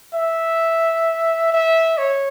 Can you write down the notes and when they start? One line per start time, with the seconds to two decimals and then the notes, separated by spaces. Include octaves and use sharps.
0.14 E5
1.53 E5
1.98 C#5